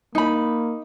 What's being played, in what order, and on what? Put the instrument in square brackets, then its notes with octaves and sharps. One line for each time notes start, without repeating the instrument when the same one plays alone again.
[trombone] A#3 [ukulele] D#4 B5